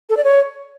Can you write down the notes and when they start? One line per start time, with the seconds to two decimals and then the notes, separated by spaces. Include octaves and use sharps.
0.10 A4
0.17 D5
0.24 C#5